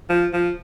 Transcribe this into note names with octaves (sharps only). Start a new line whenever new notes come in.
F3
F3